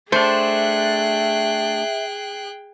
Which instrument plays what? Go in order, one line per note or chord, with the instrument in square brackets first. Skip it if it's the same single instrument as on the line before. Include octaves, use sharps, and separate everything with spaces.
[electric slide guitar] A3 D4 [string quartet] G#4 G5 F#6 [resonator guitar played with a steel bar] C5 [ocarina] E5